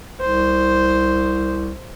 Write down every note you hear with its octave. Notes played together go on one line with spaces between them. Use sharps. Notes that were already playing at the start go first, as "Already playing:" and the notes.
C2 C5